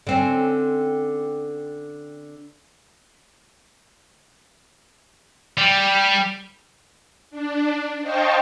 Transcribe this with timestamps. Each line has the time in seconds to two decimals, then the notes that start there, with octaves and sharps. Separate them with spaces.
0.07 D3 C4 C#4
5.58 G3
7.31 D4
8.02 C5 D#5 F5 G5 A5 C#6